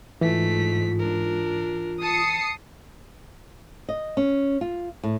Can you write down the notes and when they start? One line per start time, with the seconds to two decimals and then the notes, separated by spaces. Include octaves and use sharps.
0.21 G#2 E3 A3 F4 B6
0.99 D4 A#4
2.01 A5 D#6 C7 C#7
3.89 D#5
4.17 C#4
4.61 F4
5.04 A2